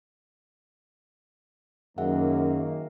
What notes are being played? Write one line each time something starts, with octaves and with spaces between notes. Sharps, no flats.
F#2 D#3 A#3 G#4 E5 F#5